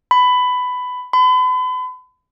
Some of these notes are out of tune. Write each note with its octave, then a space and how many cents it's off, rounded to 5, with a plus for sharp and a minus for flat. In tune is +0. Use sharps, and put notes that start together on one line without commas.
B5 +15
B5 +40